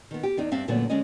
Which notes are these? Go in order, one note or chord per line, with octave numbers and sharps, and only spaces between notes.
D#3 B3
G4
E2 D4 D#4
G2 C4 D4 E5 F5
F#2 A#2 D3 F#3 A3 B3
D3 G#3 C#4 D#5